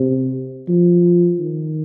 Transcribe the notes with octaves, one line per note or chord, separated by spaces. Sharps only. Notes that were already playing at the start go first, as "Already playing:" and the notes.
Already playing: C3
F3
D#3